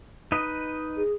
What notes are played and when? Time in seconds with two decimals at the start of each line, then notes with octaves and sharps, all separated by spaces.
0.32 D#4 B4 D#5
0.97 G#4